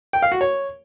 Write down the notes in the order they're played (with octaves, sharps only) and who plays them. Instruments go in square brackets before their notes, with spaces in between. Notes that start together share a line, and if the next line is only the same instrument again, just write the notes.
[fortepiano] G5
F5
F#4
C#5